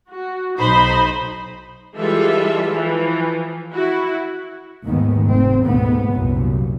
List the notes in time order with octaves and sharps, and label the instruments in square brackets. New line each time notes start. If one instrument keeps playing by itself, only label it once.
[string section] F#4
B1 D#4 C5 B5
[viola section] E3 G3 G#3 F4 A4 E5
E3 F3
E4 F#4
[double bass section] D#2 G#2 D#3 G#3 B3
F1 C4
D2 G#2 B2 B3
C2 F#2 A#2